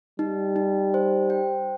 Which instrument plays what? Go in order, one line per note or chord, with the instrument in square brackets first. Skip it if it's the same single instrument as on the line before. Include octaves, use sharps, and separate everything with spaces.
[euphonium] G3 [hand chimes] D#4
[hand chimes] D#4
C5
G5